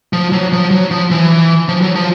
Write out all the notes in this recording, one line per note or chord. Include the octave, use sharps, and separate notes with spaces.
F3
F#3
F3
F#3
F3
E3
F3
F#3
F3